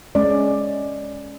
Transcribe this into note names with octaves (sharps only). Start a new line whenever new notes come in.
G#3 C#4 D5